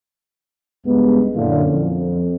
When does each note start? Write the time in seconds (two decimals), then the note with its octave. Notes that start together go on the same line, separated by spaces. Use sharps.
0.85 C#2 G2 G#3 B3
1.35 F#2 A#2 D3 C#4 E4 F4
1.71 F2